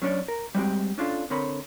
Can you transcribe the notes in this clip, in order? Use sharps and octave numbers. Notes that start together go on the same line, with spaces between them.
F#3 C#4 D4 C#5 D5
A#4
G3 G#3 C4 F#4 G4
C#4 D4 F4 G#4 A4
D3 C4 A#4 C#5 B5